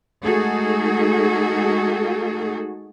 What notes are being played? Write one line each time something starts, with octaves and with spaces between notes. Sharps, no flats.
G#3 A3 D#4 F#4 G#4 A4